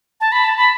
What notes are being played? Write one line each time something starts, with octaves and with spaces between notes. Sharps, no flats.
A5
B5
A5
B5